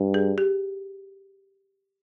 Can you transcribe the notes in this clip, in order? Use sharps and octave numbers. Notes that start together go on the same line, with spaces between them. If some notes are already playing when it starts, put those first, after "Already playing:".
Already playing: G2
G#4
G4